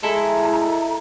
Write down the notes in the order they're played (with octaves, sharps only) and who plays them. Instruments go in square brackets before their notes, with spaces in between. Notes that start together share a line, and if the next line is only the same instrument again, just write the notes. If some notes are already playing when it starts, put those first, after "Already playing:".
[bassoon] G#3 [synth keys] E4 A4 [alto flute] A#5